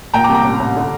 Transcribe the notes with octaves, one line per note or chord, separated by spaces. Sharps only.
A#2 G5 A#5
A#5 D6
C2
A#5 D6
A1
A1
D3